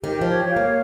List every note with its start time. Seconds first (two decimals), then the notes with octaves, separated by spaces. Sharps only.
0.04 D#3 G4
0.21 F3
0.26 C#5
0.50 F5
0.56 A#3